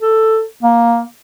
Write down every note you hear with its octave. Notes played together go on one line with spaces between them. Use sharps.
A4
A#3